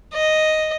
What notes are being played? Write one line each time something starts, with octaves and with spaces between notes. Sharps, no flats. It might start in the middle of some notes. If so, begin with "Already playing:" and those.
D#5